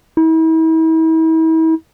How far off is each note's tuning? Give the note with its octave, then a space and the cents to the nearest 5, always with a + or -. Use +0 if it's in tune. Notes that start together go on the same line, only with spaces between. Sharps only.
E4 -40